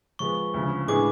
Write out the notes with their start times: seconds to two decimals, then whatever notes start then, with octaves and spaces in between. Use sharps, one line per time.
0.19 F3 G#3 B3 C#6
0.54 D2 C#3 F3
0.88 A2 G#3 B3 D4 G#4 D6